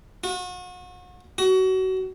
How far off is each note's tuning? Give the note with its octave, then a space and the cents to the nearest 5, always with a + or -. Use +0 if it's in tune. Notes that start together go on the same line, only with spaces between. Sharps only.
F#4 -40
F#4 +25